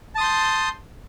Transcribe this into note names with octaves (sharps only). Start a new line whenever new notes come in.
A5 C6 D#6 G6